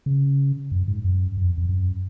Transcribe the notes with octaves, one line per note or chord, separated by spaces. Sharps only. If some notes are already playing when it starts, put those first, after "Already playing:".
C#3
F#2
G#2
F#2
F#2
F2
F2
F#2